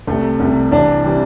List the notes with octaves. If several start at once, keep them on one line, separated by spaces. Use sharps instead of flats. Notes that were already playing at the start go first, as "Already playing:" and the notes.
C2 C3 G3 A3
C2 C3 G3
C2 C3 E3 G3 D4
C3 E3 G3